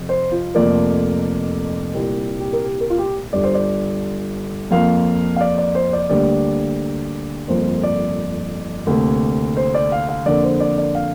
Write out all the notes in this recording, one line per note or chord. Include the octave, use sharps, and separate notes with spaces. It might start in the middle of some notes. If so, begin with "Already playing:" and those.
Already playing: F2 C3
C5
F4
F1 F2 F3 A#3 D5
C2 A#2 G3 A#3
G4
A#4
G4
A#4
F4
G4
G1 G2 G3 D5
C5
D5
F2 F3 A#3 F5
F5
D5
D5
C5
D5
D2 D3 G3 A#3 D5
G1 F2 F3 A#3 C5
D5
D2 C3 A#3
C5
D5
F5
F5
F2 D3 A#3 D5
C5
D5
D5
F5